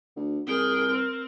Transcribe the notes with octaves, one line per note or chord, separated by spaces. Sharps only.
D2
C2 G#4 A#4 G5
C4